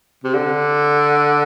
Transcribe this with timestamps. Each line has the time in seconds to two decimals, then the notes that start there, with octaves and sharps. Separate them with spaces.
0.24 C3
0.34 D3